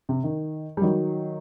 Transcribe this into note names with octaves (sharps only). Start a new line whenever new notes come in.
C3
D#3
G3
D#3 F#3